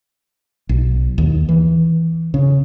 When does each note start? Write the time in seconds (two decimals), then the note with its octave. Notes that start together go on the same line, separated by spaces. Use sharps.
0.69 B1
1.18 D#2
1.49 E3
2.34 C#3